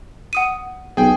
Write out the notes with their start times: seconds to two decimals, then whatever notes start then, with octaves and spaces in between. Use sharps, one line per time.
0.33 F#5 D#6 D#7
0.97 B1 G#4 G5